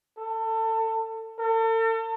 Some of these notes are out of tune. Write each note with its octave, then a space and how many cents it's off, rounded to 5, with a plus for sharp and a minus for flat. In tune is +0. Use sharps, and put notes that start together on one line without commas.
A4 +25
A4 +40